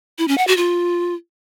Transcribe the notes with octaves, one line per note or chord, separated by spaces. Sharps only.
E4
C#4
F#5
F#4
F4